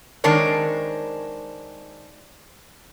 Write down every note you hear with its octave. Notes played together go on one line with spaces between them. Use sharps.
D#3 G#3 C4 D4 A#4 C#5